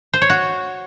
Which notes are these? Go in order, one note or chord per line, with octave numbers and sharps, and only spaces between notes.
C5
C#5
F#4